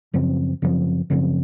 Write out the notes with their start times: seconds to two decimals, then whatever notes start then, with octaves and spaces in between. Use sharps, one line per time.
0.14 F#2 C#3 F3 C4
0.62 F#2 C#3 F3 C4
1.10 F#2 C#3 F3 C4